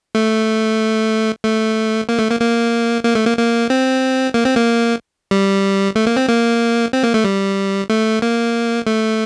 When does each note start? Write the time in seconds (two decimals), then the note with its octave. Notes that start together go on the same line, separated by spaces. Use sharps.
0.15 A3
1.44 A3
2.09 A#3
2.19 A3
2.30 A#3
2.40 A#3
3.05 A#3
3.15 A3
3.27 A#3
3.38 A#3
3.70 C4
4.34 A#3
4.45 C4
4.56 A#3
5.31 G3
5.96 A3
6.07 A#3
6.17 C4
6.28 A#3
6.93 C4
7.03 A#3
7.14 A3
7.24 G3
7.90 A3
8.22 A#3
8.87 A3